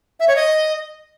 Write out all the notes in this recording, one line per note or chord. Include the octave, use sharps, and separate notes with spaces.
E5
C#5
D#5